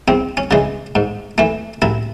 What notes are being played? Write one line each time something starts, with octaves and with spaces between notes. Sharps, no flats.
E2 C4
C#4
C#3 E3 G#3
G#2
E3 A3
A1 E4